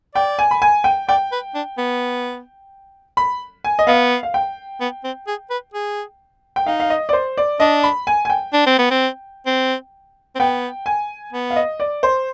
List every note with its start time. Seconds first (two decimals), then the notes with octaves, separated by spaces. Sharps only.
0.15 D5 G5
0.39 G#5
0.51 B5
0.62 G#5
0.84 G5
1.08 D5 G5
1.32 B4
1.55 D4
1.78 B3
3.17 B5
3.64 G#5
3.79 D#5
3.87 B3 F5
4.23 F5
4.34 G5
4.81 B3
5.04 C4
5.27 G#4
5.50 B4
5.74 G#4
6.56 G5
6.66 D#4 F5
6.80 F5
6.90 D#5
7.09 D5
7.13 C5
7.37 D5
7.60 D4 D#5
7.84 B5
8.07 G#5
8.25 G#5
8.30 G5
8.53 D4
8.66 C4
8.78 B3
8.91 C4
9.46 C4
10.35 C4
10.39 B3 G5
10.86 G#5
11.33 B3
11.51 F5
11.56 D#5
11.80 D5
12.03 C5